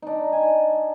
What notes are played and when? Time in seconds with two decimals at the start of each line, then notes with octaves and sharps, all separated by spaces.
0.02 D4 D#4
0.32 G#5